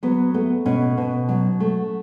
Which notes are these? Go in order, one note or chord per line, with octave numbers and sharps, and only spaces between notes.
F#3 B3
A3 B3
B2 C#4
B2
F#3
A3